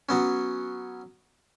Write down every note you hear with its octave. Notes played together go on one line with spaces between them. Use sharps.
F#3 B3 C#4